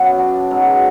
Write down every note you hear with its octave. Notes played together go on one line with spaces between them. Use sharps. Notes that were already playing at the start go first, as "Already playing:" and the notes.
Already playing: F#2 B3
D4
G#2 F#3 B3